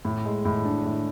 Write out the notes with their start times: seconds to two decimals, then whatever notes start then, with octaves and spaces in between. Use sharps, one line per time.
0.05 A2
0.25 G#3
0.45 A2
0.65 D4
0.85 A2